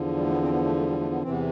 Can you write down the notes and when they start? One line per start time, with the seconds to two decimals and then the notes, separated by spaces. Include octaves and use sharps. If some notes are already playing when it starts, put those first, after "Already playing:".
Already playing: E2 D3 F3
0.16 G3
0.23 A3
0.30 B3
0.41 C4
0.53 B3
0.64 A3
0.76 A3
0.87 G3
0.99 A3
1.11 B3
1.21 E2 C3 E3 C4
1.30 B3